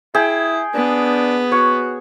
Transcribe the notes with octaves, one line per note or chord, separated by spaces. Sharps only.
E4 G#4 G5
B3 D4
F#4 C#5